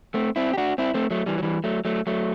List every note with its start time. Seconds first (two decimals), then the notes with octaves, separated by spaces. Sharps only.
0.14 A3 C4
0.36 C4 E4
0.53 G4
0.57 D4 F#4
0.78 C4 E4
0.94 A3 C4
1.11 F#3 A3
1.26 E3 G3
1.38 F#3
1.43 E3 G3
1.64 F#3 A3
1.85 F#3 A3
2.07 F#3 A3